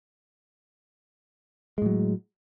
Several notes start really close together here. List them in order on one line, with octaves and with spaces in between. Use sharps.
G#3 A2 F#3